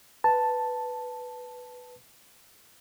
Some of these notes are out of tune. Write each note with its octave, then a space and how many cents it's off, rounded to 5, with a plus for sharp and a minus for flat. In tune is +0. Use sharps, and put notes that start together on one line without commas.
B4 +5 A5 +0